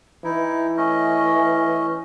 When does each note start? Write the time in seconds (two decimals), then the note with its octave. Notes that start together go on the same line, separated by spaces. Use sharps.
0.24 E3 D#4 E4
0.77 A3 C#4 D#5